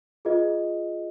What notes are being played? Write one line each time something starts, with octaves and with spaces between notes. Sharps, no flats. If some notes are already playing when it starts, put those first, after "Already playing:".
F4 G#4 B4 D#5